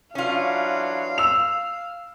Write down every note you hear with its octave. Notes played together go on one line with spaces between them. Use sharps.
E3 F#3 C#4 D4 F4 F5
E6 F7